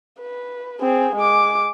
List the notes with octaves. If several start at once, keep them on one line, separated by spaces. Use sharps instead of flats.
B4
C4 G#4
G#3 D6